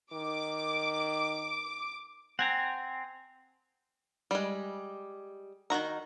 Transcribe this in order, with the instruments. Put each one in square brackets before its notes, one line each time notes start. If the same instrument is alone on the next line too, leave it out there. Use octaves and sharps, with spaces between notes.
[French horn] D#3 [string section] D6
[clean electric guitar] C4 [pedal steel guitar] F#5 G#5 A#5
[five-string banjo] G3 G#3
D#3 G#3 F#4 A#5